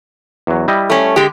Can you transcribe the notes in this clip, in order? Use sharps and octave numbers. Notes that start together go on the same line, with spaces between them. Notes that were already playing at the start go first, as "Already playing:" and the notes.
E2 F#3
G3 E4 D#5
A3 C#4
D3 G#3 G4